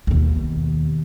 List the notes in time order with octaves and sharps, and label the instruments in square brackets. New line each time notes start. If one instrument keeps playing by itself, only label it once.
[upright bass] D#2 B2